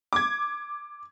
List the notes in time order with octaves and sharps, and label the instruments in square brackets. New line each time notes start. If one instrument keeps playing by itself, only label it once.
[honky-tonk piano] D6 G#6